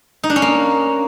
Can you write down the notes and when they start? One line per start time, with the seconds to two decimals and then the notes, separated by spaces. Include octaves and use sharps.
0.24 D#4
0.30 D4
0.36 C#4
0.42 A#3